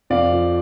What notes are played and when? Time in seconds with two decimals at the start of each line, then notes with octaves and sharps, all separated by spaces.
0.10 F2 D5 F5
0.33 F3